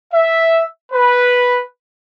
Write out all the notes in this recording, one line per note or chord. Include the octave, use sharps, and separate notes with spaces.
E5
B4